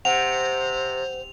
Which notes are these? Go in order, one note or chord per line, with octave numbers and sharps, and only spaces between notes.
C3 C5 F#5 F7